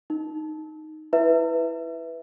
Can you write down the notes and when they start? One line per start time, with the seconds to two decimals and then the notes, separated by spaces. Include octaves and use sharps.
0.10 D#4
1.13 E4 B4 E5